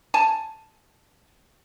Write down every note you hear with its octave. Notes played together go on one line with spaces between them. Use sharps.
G#5 A5